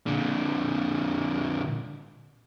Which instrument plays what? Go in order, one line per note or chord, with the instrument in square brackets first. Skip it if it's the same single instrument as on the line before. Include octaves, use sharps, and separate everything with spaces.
[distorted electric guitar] A#2 D3